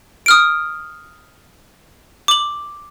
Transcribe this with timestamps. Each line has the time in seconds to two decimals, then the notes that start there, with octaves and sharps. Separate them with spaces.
0.26 D#6 F6 D7
2.28 D6 F#7